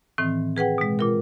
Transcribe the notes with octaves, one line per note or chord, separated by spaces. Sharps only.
A2 D#3 E3 C4
G#4 B4 F#5 G5
B2 G#3
A#2 F4 A#4